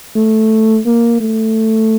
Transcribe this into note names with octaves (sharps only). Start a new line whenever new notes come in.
A3
A#3
A3